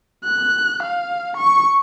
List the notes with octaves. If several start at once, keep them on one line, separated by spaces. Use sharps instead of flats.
F#6
F5
C#6